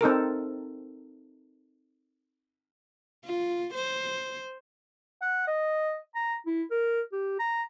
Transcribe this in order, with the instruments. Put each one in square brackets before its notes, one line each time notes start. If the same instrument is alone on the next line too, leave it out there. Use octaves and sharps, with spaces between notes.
[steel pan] C4 D#4 A4 A#4
[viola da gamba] F4
C5
[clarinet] F#5
D#5
A#5
E4
A#4
G4
A#5